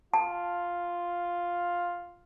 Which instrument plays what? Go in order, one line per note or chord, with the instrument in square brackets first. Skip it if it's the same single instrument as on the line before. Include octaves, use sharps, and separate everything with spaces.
[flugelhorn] F4 [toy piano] A5